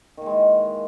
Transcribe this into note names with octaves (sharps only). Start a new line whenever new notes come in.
D#3 E3 G#3 A#3